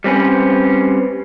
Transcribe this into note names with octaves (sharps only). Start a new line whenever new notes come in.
G3 C4 C#4 B4